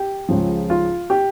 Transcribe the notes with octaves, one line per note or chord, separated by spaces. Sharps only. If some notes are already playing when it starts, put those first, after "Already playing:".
Already playing: G4
C#2 C#3 F3
F4
G4